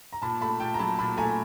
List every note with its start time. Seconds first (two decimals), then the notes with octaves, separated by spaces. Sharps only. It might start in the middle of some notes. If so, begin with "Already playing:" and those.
0.13 A#5
0.22 A#2 A5 B5
0.41 A3 A5 B5
0.60 A#2 G5 A5
0.74 A#5
0.79 F#3 A5 B5
0.99 A#2 A5 B5
1.17 A3 G#5 A#5